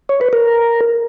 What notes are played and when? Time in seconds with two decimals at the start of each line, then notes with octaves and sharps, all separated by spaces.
0.09 C#5
0.21 B4
0.33 A#4